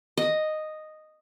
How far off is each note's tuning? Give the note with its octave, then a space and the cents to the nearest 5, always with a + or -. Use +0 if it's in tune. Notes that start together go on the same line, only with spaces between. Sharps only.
D#5 -5